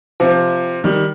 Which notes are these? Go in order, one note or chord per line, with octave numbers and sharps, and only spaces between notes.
C3 F3
D#3 G3